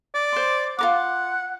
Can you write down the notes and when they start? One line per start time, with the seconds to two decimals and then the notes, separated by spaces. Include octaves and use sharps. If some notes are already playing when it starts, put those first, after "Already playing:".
0.14 D5
0.32 C5 C6
0.79 F4 A#4 F#5 D6